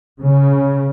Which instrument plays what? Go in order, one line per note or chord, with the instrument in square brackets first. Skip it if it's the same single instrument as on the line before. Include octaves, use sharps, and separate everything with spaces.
[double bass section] C#3